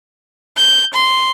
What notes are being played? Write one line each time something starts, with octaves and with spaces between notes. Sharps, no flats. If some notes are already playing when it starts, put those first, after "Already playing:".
G6
C6